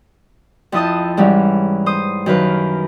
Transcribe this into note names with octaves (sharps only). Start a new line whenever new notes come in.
F2 F3 E4 D#5 A5 D#6
G#2 E3 G3 C#4
C5 D#6
F#2 D#3 B4 F5